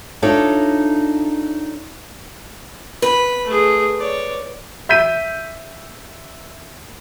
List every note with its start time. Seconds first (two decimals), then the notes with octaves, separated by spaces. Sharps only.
0.22 D4 D#4 F4 A4 C#5 E5
3.02 B4 B5
3.47 A3 G#4
3.99 C#5 D5
4.89 E5 G6 B6 D#7